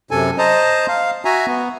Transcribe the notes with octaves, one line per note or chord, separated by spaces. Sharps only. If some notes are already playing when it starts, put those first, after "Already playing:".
F#2 C3 A4 G#5
C5 D#5 A5 A#5
F5
F#4 E5 G#5 A#5
B3